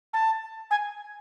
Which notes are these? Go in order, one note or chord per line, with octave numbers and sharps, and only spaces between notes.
A5
G#5